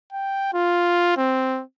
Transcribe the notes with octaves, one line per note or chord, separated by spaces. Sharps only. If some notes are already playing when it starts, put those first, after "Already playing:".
G5
F4
C4